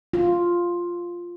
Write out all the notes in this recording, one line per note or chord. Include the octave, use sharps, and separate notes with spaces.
F4